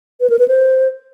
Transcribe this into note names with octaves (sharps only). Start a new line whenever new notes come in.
B4
A#4
B4
C5